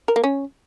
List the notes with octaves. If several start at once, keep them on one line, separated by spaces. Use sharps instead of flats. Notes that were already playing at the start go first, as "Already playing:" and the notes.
A#4
A#3
C#4